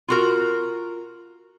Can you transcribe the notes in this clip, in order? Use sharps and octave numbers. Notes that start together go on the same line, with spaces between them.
F4 F#4 A#4